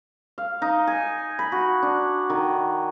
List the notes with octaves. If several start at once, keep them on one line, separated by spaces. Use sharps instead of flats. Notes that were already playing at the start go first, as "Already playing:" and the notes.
F5
D#4
G#5
B5
F#4
D4
D#3